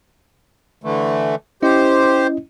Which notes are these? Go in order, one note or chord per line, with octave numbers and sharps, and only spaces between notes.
D3 E3 A3
C#4 E4 G4 C5 D#5